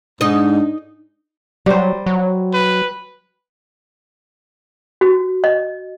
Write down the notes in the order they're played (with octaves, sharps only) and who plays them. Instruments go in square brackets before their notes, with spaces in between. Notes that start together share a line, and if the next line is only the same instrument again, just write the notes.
[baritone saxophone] G#2 [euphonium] D4 [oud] D#4 D#5
[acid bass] F#3 [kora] G3 C5
[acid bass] F#3
[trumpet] B4
[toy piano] F#4
D#5